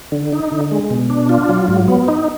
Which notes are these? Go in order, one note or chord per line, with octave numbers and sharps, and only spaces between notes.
D3
D#4
D3
G#3
B2
D4
F4
F#3
G#2
B3
D#4